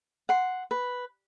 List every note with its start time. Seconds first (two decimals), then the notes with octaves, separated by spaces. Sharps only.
0.29 F#5 C6
0.71 B4